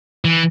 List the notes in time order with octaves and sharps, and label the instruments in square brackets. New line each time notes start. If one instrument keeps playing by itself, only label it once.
[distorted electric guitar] E3